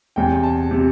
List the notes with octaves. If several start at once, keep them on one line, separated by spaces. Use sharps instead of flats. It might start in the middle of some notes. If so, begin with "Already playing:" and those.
E1 E2 C3 G5
A5
C3